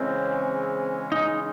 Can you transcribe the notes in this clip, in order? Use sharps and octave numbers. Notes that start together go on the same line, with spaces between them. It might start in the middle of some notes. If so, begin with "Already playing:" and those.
Already playing: C#3 E3 G#3 C4 C#4
D#4